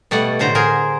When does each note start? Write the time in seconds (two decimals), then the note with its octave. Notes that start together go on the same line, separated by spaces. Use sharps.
0.11 B2 G3 A3 A4 F#5
0.39 A2 D3 C5 A#5
0.55 G#4 A#4